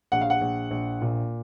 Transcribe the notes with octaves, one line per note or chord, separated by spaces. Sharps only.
A#1 F#5
F5
F#5
A#1
A#1
A#2